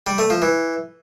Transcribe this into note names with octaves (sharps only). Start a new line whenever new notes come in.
G3
A3
F3
E3